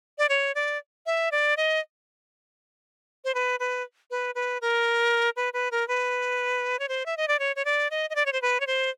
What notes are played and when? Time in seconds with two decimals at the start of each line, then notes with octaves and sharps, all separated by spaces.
0.18 D5
0.29 C#5
0.55 D5
1.06 E5
1.32 D5
1.57 D#5
3.25 C5
3.35 B4
3.60 B4
4.11 B4
4.35 B4
4.61 A#4
5.36 B4
5.53 B4
5.71 A#4
5.88 B4
6.79 C#5
6.89 C5
7.06 E5
7.17 D#5
7.28 D5
7.39 C#5
7.56 C#5
7.65 D5
7.91 D#5
8.10 D#5
8.15 D5
8.26 C#5
8.33 C5
8.42 B4
8.60 C#5
8.67 C5